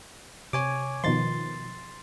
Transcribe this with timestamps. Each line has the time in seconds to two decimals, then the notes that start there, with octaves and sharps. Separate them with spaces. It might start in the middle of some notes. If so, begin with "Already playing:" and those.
0.53 C3 C#5 G#5 D6
1.04 B2 D#3 F3 C6 A6